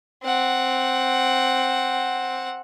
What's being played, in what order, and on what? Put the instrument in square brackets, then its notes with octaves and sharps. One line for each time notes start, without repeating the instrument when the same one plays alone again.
[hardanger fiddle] C4 F#5